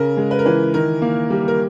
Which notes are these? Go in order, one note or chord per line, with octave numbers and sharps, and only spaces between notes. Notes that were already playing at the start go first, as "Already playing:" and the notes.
Already playing: C#3 A#4
G#3
B4
A#4
E3 B4
D#3 A#4
A#3
G3
A#4